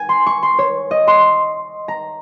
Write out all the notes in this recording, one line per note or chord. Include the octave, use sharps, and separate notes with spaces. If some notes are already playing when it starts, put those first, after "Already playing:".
Already playing: G#5
C6
C#6
C6
C#5
D#5
C6
A#5